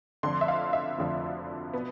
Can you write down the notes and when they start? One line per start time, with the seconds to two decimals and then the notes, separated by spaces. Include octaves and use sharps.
0.23 F1 F2 D3 F3 C6
0.41 E5
0.48 F5
0.73 E5
0.98 F1 F2 D3 F3
1.73 B2 B3